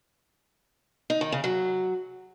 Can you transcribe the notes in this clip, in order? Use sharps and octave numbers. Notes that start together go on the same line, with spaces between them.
D#4
D#3
C#3
F#3